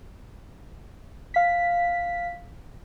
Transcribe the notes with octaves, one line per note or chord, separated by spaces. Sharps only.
F5 B6